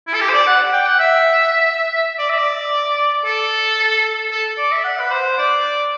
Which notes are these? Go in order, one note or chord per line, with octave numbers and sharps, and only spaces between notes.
E4
A4
G4
C5
D5
F#5
G5
F#5
E5
D5
E5
D5
A4
A4
D5
E5
F#5
B4
C5
D5